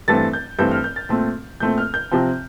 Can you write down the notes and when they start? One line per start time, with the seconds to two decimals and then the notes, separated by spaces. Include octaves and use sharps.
0.08 G2 E3 A3 C4 A6
0.33 G6
0.59 G2 E3 A3 C4 G6
0.71 F6
0.84 G6
0.96 A6
1.09 A#2 A3 C4
1.60 A#2 A3 C4 G6
1.78 F6
1.94 G6
2.12 C3 F3 C4